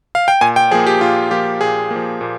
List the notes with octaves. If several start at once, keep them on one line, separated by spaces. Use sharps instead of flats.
F5
G5
A#2 G#5
G5
F3 A#3 G#4
G4
A#2 F4
F3 A#3 G4
A#2 G#4
F3 A#3
A#2